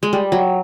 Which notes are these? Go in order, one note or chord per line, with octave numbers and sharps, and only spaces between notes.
G#3
G3
F#3